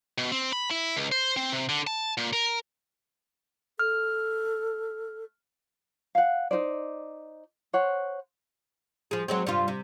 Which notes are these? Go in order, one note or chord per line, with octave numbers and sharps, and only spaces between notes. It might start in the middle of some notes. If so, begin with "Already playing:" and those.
B2
C4
B5
E4
C#2
C5
C4
C3
D3
A5
A#2
A#4
A4 F6
F5 F#5
D#4 F4 C5 D5
C5 C#5 F#5
F3 G#4
F#3 G#3 C4
G2 C3 F4
C3